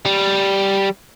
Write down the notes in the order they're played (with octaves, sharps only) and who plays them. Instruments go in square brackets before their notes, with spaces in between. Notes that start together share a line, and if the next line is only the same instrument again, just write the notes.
[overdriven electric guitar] G3